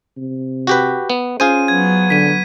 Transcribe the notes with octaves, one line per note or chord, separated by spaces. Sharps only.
C3
F#4 G4 B4
B3
C#4 F4 G#4 C5 D#7
F#3 B3 G#6
D3 B6 D#7